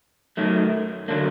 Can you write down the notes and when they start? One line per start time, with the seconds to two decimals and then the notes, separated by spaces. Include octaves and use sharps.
0.37 F#2 D#3 F#3 A3
1.08 D3 F#3 A#3 D4